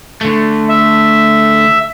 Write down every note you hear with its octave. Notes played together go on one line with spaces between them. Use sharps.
D3 A3
E5